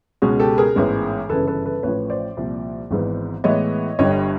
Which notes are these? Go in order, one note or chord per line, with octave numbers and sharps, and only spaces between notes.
C#2 B2 G#3 C#4 F#4 G#4
G4 A4
G#4 A#4
A1 G#2 E3 G#3 B3
G1 F#2 C#3 E3 A4 B4
A4 B4
A4 B4
A1 A2 F3 B4 C#5
C5 D5
C2 A#2 F3
G#1 G#2 E3 G#3 B3
A2 E3 G#3 B3 E4 C#5 D#5
G1 G2 D3 G3 C#5 D#5